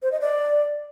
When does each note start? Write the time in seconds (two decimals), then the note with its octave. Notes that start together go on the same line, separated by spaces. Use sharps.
0.03 C5
0.12 D#5
0.21 D5